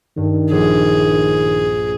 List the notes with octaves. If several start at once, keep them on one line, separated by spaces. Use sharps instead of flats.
G2 D#3
A#1 G#4